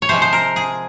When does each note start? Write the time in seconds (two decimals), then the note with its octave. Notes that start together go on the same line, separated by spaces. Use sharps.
0.02 C#5
0.09 C3 F3 G#3 C5
0.22 C5
0.33 A#4
0.56 G#4